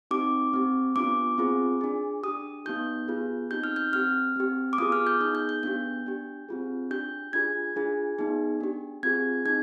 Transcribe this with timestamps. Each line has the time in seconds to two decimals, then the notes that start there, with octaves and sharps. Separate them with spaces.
0.11 C4 D#4 G4 D6
0.53 C4 G4
0.96 B3 D4 F4 D6
1.38 C4 F4 G#4
1.81 D4 G#4
2.23 D4 G4 D#6
2.66 B3 D#4 G4 G6
3.08 B3 F4 G#4
3.51 C4 D#4 G4 G6
3.64 F6
3.76 G6
3.93 C4 G4 F6
4.36 C4 G4
4.73 D6
4.78 B3 F4 G#4 D#6
4.92 F6
5.07 G6
5.21 B3 D#4 G#4 G6
5.35 G6
5.49 G6
5.63 B3 D4 G4 G6
6.06 D4 G4
6.49 C4 F4 G#4
6.91 D4 G4 G6
7.33 D4 F4 G#4 G#6
7.76 D4 F4 G#4
8.18 B3 D#4 G#4
8.60 D4 G4
9.03 C4 F4 G#4 G#6
9.46 C4 D#4 G#4 G#6